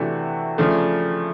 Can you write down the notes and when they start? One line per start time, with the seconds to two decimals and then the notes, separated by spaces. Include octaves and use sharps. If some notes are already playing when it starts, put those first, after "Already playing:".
Already playing: C3 E3 A3 D4 F#4
0.58 C#3 F3 A3 D4